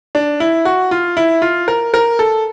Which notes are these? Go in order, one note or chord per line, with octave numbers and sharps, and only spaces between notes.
D4
E4
F#4
F4
E4
F4
A#4
A#4
A4